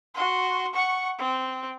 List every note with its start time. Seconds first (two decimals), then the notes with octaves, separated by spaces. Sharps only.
0.14 F#4 C6
0.73 F#5 C#6
1.18 C4